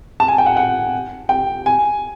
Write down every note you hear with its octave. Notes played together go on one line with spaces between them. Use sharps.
A5
G#5
G5
F#5
F#5
G5
G#5